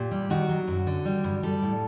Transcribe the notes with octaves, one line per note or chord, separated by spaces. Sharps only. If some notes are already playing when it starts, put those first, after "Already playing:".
Already playing: A#2 G4
G3
D#3 F#4
F#3
F#2
D3
G3
G2
G3 A4
A2